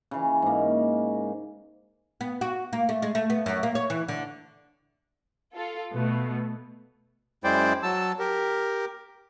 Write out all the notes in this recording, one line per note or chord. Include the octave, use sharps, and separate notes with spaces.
C#3 E3
G#2 A#3
B3
F#4
A#3
A3
G#3
A3
B3
F#2
A#3
C#5
E3
D3
F4 A4
B2 A3 B3
F#2 G#3 E4 C5 D5 G5
F#3 A5 E6
G4 A#4